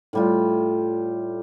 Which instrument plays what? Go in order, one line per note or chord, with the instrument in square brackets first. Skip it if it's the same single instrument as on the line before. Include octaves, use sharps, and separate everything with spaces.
[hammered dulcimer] A2 G3 F4